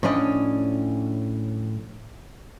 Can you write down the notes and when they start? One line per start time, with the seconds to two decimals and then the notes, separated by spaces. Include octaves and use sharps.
0.03 A2 F3 C#4 D4 D#5